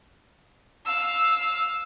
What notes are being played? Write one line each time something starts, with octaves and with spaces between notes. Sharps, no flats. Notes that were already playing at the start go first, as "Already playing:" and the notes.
F5 E6